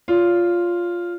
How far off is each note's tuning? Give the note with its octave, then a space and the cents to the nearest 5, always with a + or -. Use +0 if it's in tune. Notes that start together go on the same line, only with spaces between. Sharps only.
F4 +0 C#5 +45